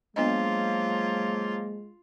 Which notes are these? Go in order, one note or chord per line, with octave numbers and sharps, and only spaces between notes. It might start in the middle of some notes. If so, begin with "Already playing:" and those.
F3 F#3 G#3 A#3 B3 D4 F4 D#5